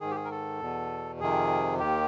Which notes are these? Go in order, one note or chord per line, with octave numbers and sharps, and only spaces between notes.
G#2 D#3 G#4
G4
G#4
A#4
A4
E2 B2
F2 C3 D#3 G#4
D#2 D#3 G4